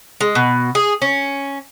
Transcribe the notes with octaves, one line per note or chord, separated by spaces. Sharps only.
G#3
B2
G#4
C#4